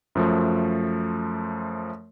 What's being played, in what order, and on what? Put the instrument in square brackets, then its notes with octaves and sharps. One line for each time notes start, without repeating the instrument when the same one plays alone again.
[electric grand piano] F#2 F3 A3